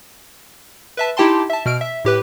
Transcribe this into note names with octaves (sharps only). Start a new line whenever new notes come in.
B4 E5 A5
D#4 E4 G4 G5 A5 C6
E5 A5
B2 F6 D7
E5
A2 G4 B4